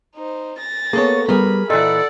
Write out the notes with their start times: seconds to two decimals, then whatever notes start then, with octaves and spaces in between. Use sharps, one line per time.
0.15 D#4 C5
0.59 A6 A#6
0.93 A#3 B3 G#4 A4 C#5
1.29 G3 B3 G#4 A#4 B5
1.70 A#2 E3 A4 D5 D#5 F#5